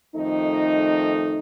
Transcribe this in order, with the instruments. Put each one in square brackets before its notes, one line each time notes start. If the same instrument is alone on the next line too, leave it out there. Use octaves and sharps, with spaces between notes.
[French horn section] F2 D#3 A3 D#4